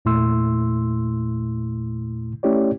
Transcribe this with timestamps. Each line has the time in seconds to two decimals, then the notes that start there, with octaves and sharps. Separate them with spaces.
0.05 E2 A#2 A3 E4 C6 E6
2.43 A3 C#4 E4 G4 C#5 D5